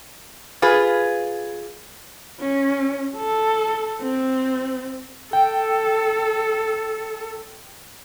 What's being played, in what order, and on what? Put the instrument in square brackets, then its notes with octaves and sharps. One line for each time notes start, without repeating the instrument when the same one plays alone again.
[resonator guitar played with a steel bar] F4 G#4 B4
[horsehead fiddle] C#4
A4
C4
[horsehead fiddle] A4 [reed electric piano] G5